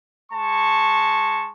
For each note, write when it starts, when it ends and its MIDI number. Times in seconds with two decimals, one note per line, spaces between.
0.32 1.50 56
0.32 1.50 81
0.32 1.50 85